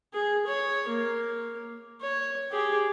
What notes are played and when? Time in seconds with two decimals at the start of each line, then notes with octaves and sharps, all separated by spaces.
0.14 G#4
0.47 C#5
0.88 A#3
2.01 C#5
2.52 G4 G#4